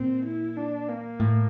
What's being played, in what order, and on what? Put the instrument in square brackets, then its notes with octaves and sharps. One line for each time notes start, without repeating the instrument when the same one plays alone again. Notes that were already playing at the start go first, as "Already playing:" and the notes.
Already playing: [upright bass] A#2 [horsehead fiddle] C4
[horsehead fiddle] E4
D4
A#3
[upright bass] A2